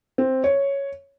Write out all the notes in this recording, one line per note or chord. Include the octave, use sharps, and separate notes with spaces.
C4
C#5